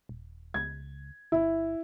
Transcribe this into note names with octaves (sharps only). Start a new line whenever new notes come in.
D#1
C#2 G#6
G1 E4